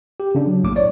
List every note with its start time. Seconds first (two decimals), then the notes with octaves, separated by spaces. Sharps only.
0.20 G4
0.35 C#3 D4
0.47 F#3
0.64 A#1 A2 A#3 D6
0.76 C#5 D5